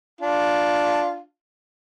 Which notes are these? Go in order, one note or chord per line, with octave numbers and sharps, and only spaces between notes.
D4 F4